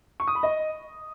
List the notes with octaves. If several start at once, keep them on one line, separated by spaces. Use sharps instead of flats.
C#6
D#6
B5
D#5